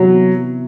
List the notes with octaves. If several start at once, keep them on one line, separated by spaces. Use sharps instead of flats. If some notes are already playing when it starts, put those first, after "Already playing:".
Already playing: C3 E3 F#3 B3 F#4